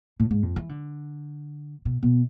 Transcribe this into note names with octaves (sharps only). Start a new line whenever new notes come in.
A2
G#2
F2
E3
D3
B2
B2